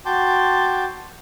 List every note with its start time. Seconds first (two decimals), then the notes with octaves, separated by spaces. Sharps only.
0.05 F#4 G5 A5 C6 D6